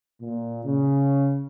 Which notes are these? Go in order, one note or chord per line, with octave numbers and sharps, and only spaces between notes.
A#2
C#3